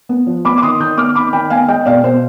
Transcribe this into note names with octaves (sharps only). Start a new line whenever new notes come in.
B3
F3
B3 B5 D6
D6
D#3 C6 D#6
D#3 D#6 G6
B3 D6 F6
D#3 B5 D6
D#3 G5 B5
B3 F5 G#5
G#3 D#5 G5
B2 D5 F5
B2 C5